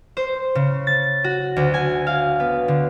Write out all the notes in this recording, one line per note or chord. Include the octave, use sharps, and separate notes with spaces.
C5
C#3
A6
F#4
D2
G#5
F5
B3
D3